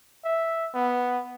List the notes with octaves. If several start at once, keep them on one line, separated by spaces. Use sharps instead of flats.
E5
B3